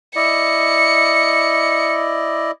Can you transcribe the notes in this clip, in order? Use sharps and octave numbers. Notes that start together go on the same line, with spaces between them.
E4 D5 D#5 C#7